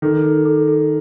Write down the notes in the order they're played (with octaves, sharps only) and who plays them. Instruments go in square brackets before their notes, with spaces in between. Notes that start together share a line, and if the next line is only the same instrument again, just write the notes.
[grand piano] D#3 [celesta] A4
[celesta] A4
A4
A4